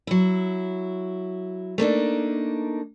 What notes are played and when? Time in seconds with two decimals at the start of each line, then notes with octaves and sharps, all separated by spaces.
0.07 F#3 E4
1.78 A3 A#3 D4 D#4